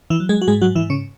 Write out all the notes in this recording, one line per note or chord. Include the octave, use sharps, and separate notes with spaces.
E3 E4
F#3
G#3 G#4
F#4
G#2 G#3 G#4
F#3 F#4
G#2 E3 E4
C#3 C#4